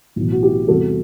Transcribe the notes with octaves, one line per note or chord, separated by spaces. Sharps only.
B1 A2 E3
F#4
E4 G4
E2 C3 G3 F#4 A4